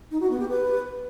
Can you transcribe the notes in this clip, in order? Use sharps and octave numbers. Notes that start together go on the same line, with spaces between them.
D#4
F#4
B3
G4
B4